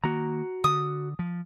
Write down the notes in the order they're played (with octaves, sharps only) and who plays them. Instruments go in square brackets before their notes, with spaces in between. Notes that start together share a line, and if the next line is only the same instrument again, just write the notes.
[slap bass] D#3 A#3 [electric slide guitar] F#4 A#5
[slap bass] D3 [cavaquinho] D#6
[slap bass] F3